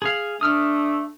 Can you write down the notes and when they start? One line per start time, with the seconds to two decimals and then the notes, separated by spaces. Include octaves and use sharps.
0.02 G#4 F5
0.41 A3 D4 D#6 F6